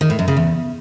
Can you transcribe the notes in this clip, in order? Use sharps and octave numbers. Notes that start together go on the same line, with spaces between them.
D#3
A2
F#2
C#3
E2